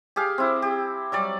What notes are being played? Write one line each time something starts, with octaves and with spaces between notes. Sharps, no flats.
G4 G#4 F5
C4 E4
G4
F#3 G3 D5